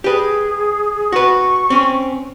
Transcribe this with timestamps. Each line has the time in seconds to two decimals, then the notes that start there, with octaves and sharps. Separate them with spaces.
0.04 G4 G#4 B4
1.12 F#4 B4 C#6
1.70 C4 C#4